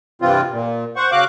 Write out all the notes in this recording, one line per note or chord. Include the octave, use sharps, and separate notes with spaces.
G2 C3 E3 C4 F4
A#2
C5 F#5 C#6
C#3 F#4 F5 D6 F#6